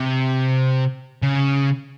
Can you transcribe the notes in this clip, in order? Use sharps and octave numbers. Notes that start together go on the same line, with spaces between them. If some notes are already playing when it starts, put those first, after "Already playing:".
Already playing: C3
C#3